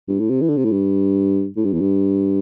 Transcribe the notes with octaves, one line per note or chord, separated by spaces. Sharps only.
G2
A2
C3
E3
D3
C3
A2
G2
A2
G2
E2
G2